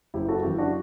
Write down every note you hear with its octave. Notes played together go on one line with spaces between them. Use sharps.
F#1 E4 G4
F#4 A4
F#2 E3 E4 G4
D4 F#4